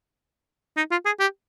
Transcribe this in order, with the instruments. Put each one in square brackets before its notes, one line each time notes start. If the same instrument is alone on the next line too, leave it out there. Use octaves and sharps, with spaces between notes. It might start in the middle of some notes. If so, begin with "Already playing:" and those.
[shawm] D#4
F4
G#4
G4